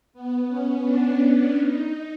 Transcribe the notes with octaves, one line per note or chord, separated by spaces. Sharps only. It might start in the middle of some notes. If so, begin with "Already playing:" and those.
B3
C#4
D4
D4
D#4